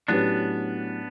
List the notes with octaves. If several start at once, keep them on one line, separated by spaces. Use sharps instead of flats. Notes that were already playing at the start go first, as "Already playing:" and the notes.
A2 F#3 B3 C#4 D4 G4 B4